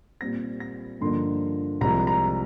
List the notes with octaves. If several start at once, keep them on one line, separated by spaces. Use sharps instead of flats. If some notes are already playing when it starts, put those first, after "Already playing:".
A#2 G3 C4 A#6
A#6
G2 D3 F3 A#3 D#4 C6
C2 C3 F3 G#3 A#5
A#5